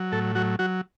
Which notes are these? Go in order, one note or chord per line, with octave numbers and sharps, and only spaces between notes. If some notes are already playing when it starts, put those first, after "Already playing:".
Already playing: F#3
A2 A4
F#3 F#4
F#3 F#4